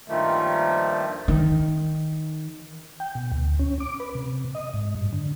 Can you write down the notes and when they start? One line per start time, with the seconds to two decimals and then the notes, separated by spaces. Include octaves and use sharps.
0.08 G2 A#2 D#3 F3 G3 A3
1.28 D#3
3.00 G5
3.15 B2
3.32 D2
3.59 C#4
3.80 D6
4.00 B4
4.15 C3
4.55 D#5
4.74 G#2
4.95 G2
5.13 D3